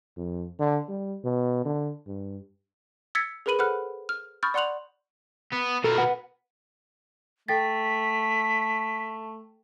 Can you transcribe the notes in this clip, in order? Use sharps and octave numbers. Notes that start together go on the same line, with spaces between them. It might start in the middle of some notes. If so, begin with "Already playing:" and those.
F2
D3
G3
B2
D3
G2
E6 G#6 A6 B6 C#7
G#4 A#4 B4 B5 D#7 F#7
A4 C5 F#5 B5 F6 F#6
F6
B5 C#6 D#6 F6 G6 A6
D5 F#5 C6 F#6 F7 F#7
B3
B2 A4 A#4
B4 F#5
A3 A4 G5 A6 B6